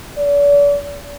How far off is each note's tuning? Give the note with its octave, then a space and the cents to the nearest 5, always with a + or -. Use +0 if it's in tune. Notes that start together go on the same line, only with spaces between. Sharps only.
D5 -40